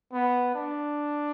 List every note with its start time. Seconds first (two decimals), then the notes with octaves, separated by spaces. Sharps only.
0.12 B3
0.55 D4